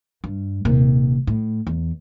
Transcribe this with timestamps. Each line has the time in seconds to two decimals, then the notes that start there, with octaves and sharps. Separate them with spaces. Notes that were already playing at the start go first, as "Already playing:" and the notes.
0.24 G2
0.65 D#1 C3
1.27 A2
1.67 E2